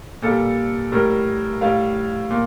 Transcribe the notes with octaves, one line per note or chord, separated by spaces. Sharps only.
A#2 G3 A4
A2 G3 A#4
A2 G3 F5
A#2